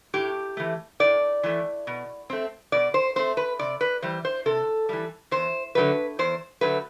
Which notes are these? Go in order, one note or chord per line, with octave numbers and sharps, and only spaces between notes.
A2 G4
E3 A3
A2 D5
E3 A3
B2
A3 C4
B2 D5
C5
A3 C4 C5
B4
C3 D5
B4
E3 G3 C5
C5
C3 A4
E3 G3
E2 C5
D3 F#3 A3 B4
E2 C5
D3 F#3 A3 B4